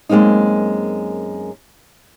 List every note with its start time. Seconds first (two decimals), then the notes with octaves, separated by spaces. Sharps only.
0.09 F#2 G#3 A#3 C4 D#4